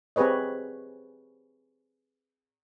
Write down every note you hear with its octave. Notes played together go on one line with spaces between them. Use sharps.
C4 G4 G#4 B4 C#5 D#5